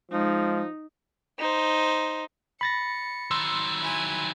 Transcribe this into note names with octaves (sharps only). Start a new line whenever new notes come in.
F3 G#3 D#4
D#4 C5
B5 A6 A#6 C#7
D#3 F#3 C6 E6
E4 G#5